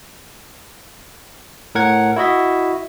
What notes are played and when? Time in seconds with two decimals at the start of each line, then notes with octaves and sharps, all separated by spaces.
1.75 A2 A#4 F#5 G#6
2.16 E4 F#4 D#5 E5